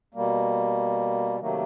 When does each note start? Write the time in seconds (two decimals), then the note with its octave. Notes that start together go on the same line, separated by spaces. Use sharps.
0.14 B2 G3 A#3
1.40 C3 D#3 F#3 A3 A#3